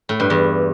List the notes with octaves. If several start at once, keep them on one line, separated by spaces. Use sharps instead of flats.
A2
G2
E2